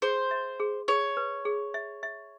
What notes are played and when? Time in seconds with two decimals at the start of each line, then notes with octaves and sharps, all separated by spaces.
0.02 G#4 C5
0.31 E5
0.60 G#4
0.88 G#4 C#5
1.17 B4
1.45 G#4
1.74 E5
2.03 E5